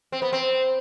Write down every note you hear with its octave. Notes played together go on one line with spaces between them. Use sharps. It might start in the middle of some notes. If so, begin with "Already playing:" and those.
C4
B3
C4